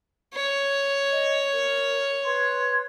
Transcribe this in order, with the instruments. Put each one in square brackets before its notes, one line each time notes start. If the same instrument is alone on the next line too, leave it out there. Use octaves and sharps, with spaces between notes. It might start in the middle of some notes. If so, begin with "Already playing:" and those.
[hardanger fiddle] C#5
[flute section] D#5
A#4
B4 C6 G#6